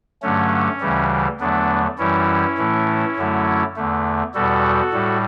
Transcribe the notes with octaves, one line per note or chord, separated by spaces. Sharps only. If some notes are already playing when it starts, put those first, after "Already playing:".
G2 D3 F#3 A3 C#4
D2 C#3 E3 G3
E2 D3 F#3 A3 B3 D4
F#2 E3 G3 C#4 E4
A2 E3 A3
F#2 D3 F#3 A3
E2 D3 A3
E2 B2 G3 F#4 A4
A2 G3